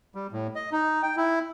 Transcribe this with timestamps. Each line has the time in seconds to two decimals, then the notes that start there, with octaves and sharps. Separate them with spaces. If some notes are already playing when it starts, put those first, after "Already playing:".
0.15 G3
0.32 A2
0.55 D#5
0.72 D#4
1.03 G5
1.17 E4